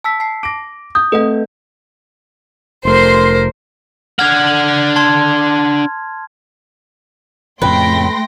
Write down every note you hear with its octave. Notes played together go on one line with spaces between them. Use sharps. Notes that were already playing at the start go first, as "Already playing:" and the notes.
A5 E6 B6
A5 C7
D6 A#6 D7
D#6 G6
A3 C4 B4 D#5 F#5
F1 A3 A#4 C5 C6
D4 F#5 F6 G#6 F7
A5 C6 G#6
F2 A2 C#3 A3 B4 G5 C6 A#6